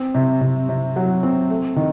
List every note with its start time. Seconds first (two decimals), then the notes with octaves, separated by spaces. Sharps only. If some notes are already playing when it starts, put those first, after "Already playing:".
Already playing: C4
0.15 C3
0.41 C3
0.69 C3
0.96 F#3
1.23 C4
1.50 A3
1.76 D#3